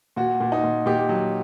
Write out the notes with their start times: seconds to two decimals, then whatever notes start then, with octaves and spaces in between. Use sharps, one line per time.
0.16 A#2 F#4
0.40 A#2
0.52 D#4
0.64 A#2
0.86 A#2 G4
1.09 F#3